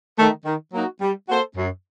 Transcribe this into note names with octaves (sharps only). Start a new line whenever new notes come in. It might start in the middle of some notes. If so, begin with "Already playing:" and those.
D#3 A3
D#3
F#3 A#3 D#4 F#4
G3
A#3 F#4 A4 C5
F#2